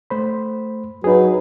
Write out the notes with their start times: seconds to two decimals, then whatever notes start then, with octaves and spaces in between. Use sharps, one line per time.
0.10 A3 C5 B5
1.04 F#3 D#4 G#4 B4